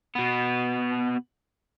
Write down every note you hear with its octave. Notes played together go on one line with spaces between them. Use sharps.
B2 B3